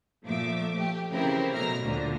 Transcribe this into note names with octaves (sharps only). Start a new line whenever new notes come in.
A#2 F3 A3 E5 D6
A3 G4
C#3 E3 C4 E4 G4 A#4
B2 F#3 A3 E5 A#5 F6
D2 A#2 D3